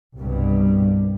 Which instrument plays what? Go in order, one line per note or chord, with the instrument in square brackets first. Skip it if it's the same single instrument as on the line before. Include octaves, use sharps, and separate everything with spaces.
[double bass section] C2 G2 B2 G3